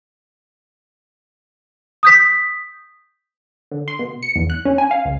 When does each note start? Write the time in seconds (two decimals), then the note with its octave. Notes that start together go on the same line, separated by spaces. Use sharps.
2.03 D#6 G6 B6
3.71 D3
3.88 C6
3.99 B2
4.23 C#7
4.36 E2
4.50 F#6
4.65 C#4
4.78 G#5
4.91 F5
5.05 C#2